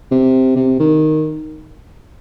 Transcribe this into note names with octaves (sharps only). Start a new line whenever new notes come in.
C3
C3
D#3